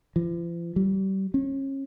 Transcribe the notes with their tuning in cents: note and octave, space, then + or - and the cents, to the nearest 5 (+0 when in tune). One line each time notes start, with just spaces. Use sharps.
F3 -45
G3 -30
C#4 -35